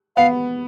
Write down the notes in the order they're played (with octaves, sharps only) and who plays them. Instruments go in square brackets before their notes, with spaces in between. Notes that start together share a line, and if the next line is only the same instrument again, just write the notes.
[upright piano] B3 [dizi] F5